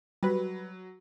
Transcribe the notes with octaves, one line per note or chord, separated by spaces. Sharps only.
F#3 G3 B4